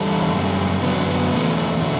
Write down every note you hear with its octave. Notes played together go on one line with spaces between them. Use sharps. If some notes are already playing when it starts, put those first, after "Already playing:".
Already playing: E2 D3 G3 A4
F#2 C#3 G3
F#2 D3 F#3 B3
C#4
B3
E2 B2 A3 C#4
D3 F#3 A3